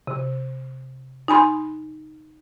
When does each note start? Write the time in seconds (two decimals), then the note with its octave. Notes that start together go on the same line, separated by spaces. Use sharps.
0.07 C3
1.28 D#4 G#5 B5 C6